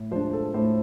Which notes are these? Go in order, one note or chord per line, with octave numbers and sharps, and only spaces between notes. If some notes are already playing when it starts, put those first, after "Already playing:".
Already playing: A2
F3 G#3 D4 C5
A4
A2 C5